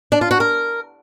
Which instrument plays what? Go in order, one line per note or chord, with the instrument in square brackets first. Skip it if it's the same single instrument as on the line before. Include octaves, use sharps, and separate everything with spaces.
[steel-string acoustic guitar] D4
F4
F#4
A#4